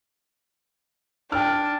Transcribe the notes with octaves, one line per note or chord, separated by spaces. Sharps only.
D4 G5 F6